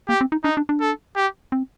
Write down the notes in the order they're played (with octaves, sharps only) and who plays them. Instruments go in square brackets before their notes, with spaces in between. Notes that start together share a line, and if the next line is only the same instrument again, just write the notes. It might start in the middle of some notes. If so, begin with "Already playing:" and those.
[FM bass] A#3 [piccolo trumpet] G4
[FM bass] C4
D#4
[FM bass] D4 [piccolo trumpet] D#4
[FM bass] D4
D4
[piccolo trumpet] A4
G4
[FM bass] C4